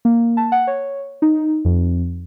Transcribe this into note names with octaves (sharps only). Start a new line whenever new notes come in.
A#3
A5
F#5
C#5
D#4
F2